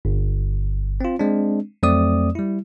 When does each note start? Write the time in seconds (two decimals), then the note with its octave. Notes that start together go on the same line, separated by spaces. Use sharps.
0.05 G1
1.01 C4 F4
1.19 G#3 C4 D4
1.83 F2 F#3 A3 C4 D5 D#6
2.35 G3 E4